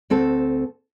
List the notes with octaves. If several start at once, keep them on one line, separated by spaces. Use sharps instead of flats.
D2 C4 A4